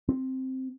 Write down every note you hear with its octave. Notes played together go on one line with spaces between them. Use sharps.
C4